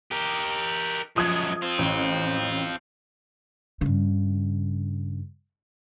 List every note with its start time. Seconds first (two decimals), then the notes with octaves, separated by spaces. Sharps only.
0.11 G4 A#4
1.16 F#2 F3 G#3 D#6 G#6
1.62 C4 F4
1.79 A1
3.81 G2 C#3